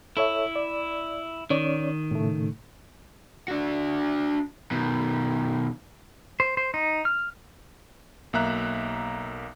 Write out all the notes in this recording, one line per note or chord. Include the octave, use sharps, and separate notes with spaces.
E4 A4 C#5 E5
D5
D#3 C#4 C#5 D5
A2 C#3 A3
D4 F#4
B2 D#3
C5
C5
D#4
F6
B1 A#3 E5 A#5 F#6